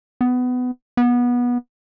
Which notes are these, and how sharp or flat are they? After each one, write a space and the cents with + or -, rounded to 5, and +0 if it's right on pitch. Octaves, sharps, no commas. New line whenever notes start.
B3 +20
B3 -20